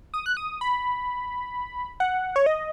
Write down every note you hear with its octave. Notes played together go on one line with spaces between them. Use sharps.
D#6
F#6
D#6
B5
F#5
C#5
D#5